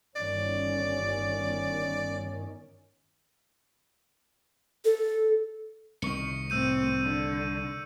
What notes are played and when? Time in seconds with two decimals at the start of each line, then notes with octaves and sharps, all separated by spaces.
0.16 G1 D#3 C#4 D5
4.85 A4
6.02 C2 D#3 C#6 C#7
6.50 A2 C4 E6 G6 D#7
7.02 D3